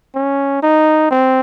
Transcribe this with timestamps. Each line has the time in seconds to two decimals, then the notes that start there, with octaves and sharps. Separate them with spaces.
0.15 C#4
0.63 D#4
1.11 C4